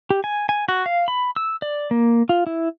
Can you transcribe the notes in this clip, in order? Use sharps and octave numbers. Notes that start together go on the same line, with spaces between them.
G4
G#5
G#5
F#4
F5
B5
E6
D5
A#3
F4
E4